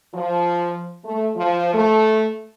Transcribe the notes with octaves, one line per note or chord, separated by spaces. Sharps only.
F3
A3
F3
A3